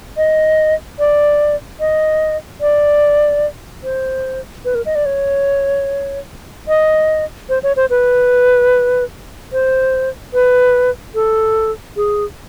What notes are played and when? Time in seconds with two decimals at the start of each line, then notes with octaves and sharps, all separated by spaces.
0.17 D#5
0.99 D5
1.80 D#5
2.61 D5
3.84 C5
4.65 B4
4.75 A#4
4.86 D#5
4.95 D5
5.06 C#5
6.68 D#5
7.49 C5
7.63 C#5
7.76 C5
7.90 B4
9.53 C5
10.34 B4
11.15 A4
11.96 G#4